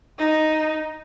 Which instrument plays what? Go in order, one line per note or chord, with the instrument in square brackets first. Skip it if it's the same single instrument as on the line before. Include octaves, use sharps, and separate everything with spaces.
[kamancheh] D#4